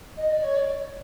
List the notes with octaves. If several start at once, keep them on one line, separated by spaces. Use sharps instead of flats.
D#5
D5
C#5
D5